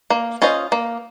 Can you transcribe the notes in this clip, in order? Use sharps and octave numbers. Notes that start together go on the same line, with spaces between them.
A#3
C#4 F4 C5 D#5
A#3